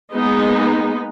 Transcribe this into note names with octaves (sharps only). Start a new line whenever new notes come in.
G#3 A#3 B3 D#4